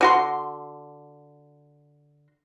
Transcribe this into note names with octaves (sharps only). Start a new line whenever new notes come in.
D3 F#4 C6